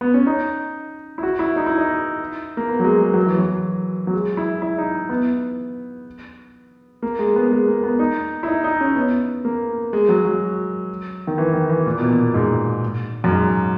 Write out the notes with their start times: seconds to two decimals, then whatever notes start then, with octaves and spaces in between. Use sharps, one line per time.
0.01 B3
0.14 C#4
0.26 D#4
1.18 E4
1.23 F#4
1.39 E4
1.56 D#4
1.66 E4
1.78 D#4
2.57 A#3
2.69 B3
2.80 F#3
2.84 G#3
3.01 G#3
3.14 F#3
3.26 E3
3.39 F#3
4.07 F#3
4.13 G#3
4.37 E4
4.62 E4
4.78 D#4
5.09 B3
7.02 A#3
7.19 G#3
7.36 B3
7.52 G#3
7.68 A#3
7.84 B3
7.99 D#4
8.43 E4
8.48 D#4
8.64 D#4
8.81 C#4
8.96 B3
9.45 A#3
9.93 G#3
10.09 F#3
10.25 F#3
11.27 D#3
11.38 E3
11.53 D#3
11.70 E3
11.86 A#2
11.98 B2
12.10 A#2
12.34 G#2
13.24 F#2
13.31 G#2